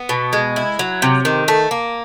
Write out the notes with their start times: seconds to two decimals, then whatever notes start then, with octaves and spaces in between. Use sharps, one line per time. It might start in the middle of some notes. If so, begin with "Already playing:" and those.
Already playing: B3
0.09 B2
0.33 G#3
0.56 E4
0.79 F#3
1.02 C3
1.25 D#3
1.48 A3
1.71 A#3